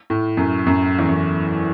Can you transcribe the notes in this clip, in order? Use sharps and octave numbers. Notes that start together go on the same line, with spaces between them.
A2
F#2
F#2
E2
F#2